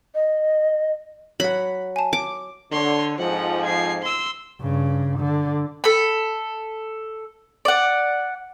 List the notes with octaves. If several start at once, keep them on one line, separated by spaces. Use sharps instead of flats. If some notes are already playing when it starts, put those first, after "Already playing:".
D#5
F#3 F#5 B5
G#5 A5
D6
D3 C#5 C6
F2 G#2 F3 F#5
G#6 C7
C6 E6
G2 C#3
D3
A4 B5
D5 F#5